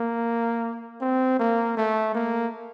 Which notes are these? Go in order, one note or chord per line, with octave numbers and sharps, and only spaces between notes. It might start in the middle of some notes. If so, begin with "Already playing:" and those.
Already playing: A#3
C4
A#3
A3
A#3